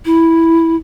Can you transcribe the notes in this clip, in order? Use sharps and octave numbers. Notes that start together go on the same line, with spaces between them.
E4